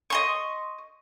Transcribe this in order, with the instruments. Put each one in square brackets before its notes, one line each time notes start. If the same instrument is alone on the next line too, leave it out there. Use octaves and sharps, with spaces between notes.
[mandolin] D#5 C6 C#6